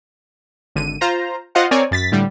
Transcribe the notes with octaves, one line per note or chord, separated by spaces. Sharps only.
G#1 D3 D#7
F4 C5 A#5
F4 C5 D#5 F5 F#5
C4 A#4 C#5 D5 G#5
F#2 A6 B6
A2 D3 G3